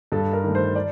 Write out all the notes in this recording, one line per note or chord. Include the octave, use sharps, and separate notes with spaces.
G2 A4
A#4
D#3 A3
C5
D5